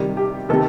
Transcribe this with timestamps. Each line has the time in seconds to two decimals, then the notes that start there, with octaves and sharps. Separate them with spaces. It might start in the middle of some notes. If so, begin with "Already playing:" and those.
Already playing: C3 D#3 G3
0.17 G4
0.49 C3 D#3 A3 A4